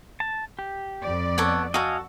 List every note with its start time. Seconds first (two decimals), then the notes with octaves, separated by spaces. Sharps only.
0.20 A5
0.59 G4
1.01 F2 D5
1.38 B3 A4 C#5 F#5
1.74 F#4 A4 D#5 F5 G#5